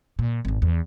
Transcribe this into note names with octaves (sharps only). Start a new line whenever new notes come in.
A#2
G#1 F#2
E2